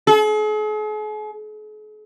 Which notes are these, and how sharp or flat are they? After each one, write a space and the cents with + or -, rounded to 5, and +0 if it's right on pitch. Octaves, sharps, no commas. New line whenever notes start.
G#4 +45